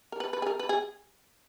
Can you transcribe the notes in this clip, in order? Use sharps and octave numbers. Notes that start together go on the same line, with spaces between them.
A#4
B4
B4
G#4
A#4
B4
G#4